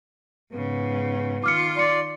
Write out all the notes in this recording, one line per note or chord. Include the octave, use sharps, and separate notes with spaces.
G#2 C#3 B3
D#3 F4 D6 F6 C#7
D5 C6 C#7